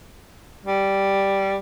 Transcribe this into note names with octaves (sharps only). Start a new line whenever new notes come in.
G3